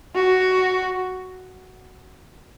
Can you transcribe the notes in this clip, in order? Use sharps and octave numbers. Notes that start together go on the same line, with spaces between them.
F#4